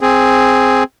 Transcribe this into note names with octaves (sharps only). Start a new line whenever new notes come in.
C4 G#4